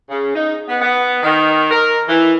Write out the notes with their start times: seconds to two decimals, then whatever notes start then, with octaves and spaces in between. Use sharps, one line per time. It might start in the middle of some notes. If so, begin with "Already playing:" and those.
0.10 C#3
0.35 D#4
0.69 B3
0.81 B3
1.23 D#3
1.71 A#4
2.09 E3